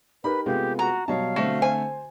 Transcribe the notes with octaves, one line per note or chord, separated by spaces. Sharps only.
D#4 G4 A#4 B4 B5
C3 G#3 A3 B3 F4 G4
F#4 A#5
B2 F#3 G3 C#5 D#5 F5 A5
D3 A3 C4 F#4
C5 G#5